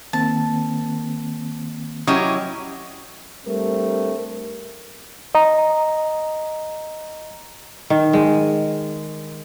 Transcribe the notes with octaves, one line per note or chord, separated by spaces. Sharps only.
D#3 A#3 C4 A5
F#3 C#4 E4 G4 C#5 D#5
G3 A3 C4 D4 A#4
D#5 A#5
D#3
G#3